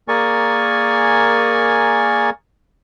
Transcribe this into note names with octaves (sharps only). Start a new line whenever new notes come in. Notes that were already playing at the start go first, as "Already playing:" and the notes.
A#3 G#4 A#4 D5 G#5 C#6